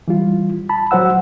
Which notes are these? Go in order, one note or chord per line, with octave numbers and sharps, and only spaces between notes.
E3 G3 F4
A5 B5
F#3 F#4 C5 F#5 E6